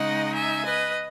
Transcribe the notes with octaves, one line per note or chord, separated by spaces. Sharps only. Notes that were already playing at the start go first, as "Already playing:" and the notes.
Already playing: C#3 G#3 D#4 D#5 F#5
E5 G#5
B4 D#5